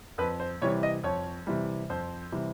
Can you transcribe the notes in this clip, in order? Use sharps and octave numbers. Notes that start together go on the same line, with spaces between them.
F2 B4
C5
C3 E3 G3 C#5
D#5
F2 C#5
C3 E3 G3
F2 C5
C3 E3 G3